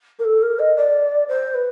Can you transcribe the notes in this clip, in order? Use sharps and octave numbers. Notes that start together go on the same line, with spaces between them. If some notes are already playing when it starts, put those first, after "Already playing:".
A#4
A4
A#4
D#5
D5
C5
B4